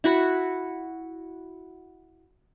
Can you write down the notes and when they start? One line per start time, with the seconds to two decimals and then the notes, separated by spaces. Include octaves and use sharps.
0.04 E4 F#4 B5